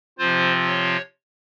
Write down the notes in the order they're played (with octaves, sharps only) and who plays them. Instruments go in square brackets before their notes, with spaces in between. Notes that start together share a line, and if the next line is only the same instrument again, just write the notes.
[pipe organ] C3 F3 C4 F4 C5
C#5